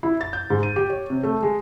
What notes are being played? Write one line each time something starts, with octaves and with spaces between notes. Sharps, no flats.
E4
A6
G6
G#2
D#7
G4
C#5
C3
A3
G#3